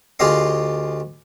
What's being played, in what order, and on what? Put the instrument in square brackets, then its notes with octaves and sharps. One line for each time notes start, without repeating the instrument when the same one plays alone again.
[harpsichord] D2 F4 G4 G#4 D#5 C6